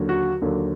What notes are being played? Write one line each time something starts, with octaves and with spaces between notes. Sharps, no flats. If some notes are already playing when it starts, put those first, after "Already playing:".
Already playing: D#2 D3 F#3
F#4
D#2 D3 F#3